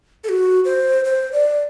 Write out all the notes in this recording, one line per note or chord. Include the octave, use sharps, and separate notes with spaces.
A4
F#4
C5
C5
D5